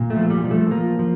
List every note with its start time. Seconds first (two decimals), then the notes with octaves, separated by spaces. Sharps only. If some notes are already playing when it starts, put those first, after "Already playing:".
Already playing: A#2
0.10 A3
0.16 F3
0.30 G3
0.44 F3
0.51 A3
0.71 F3 A#3
0.99 F3